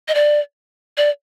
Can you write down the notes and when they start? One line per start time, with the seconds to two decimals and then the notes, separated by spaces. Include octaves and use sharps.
0.08 D#5
0.15 D5
0.97 D5